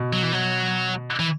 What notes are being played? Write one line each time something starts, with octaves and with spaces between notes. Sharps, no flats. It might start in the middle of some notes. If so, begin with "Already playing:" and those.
Already playing: B2
F#3
E3
F#3
E3